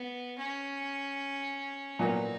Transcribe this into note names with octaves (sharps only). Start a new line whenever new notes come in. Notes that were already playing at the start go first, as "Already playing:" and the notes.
Already playing: B3
C#4
A#2 F#3 B3 D#4 F#4 A#4